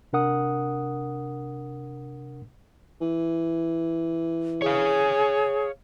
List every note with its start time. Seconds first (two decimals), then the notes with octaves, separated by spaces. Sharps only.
0.13 C3 D4 A#4 F#5 D#6
3.01 E3
4.62 G#4 C#5 F5